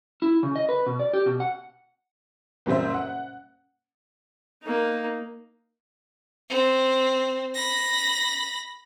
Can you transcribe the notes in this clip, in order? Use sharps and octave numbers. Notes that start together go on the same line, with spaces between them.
E4
C#3
D#5
B4
B2
D5
G4
B2
F#5
F#1 A#2 G3 C5 E5
F#5
A#3 D#4
C4
B5 A#6